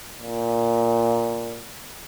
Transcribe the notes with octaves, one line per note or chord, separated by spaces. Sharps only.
A#2